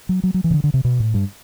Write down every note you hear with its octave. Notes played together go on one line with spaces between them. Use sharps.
F#3
F#3
F#3
E3
C3
D3
D3
C3
B2
A2
G2